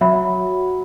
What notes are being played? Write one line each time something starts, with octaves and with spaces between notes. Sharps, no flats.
F#3 C#5 E5 B5